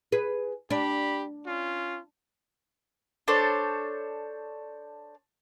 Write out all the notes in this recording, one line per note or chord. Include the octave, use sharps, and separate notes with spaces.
G#4 B4
D4 G4 B5
C#4 F4
D4 A4 C5 C#5